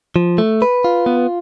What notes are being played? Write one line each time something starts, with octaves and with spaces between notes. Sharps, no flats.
F3
A3
B4
F4
B3